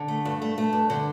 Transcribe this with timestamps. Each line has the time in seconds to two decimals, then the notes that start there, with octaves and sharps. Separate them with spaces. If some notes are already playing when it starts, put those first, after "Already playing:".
Already playing: D3
0.08 A3
0.25 G2
0.42 A3
0.58 A3
0.73 G2
0.90 D3